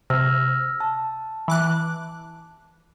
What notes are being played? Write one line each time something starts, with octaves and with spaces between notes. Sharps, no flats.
C3 E6 F6 A#6
A5
E3 D6 F#6